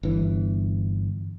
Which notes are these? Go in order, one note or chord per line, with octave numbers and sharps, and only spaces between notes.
G1 E3